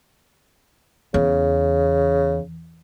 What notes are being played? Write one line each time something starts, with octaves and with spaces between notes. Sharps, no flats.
E2 C#3